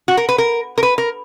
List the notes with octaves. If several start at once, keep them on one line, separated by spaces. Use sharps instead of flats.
F#4
A#4
B4
A#4
A#4
B4
A#4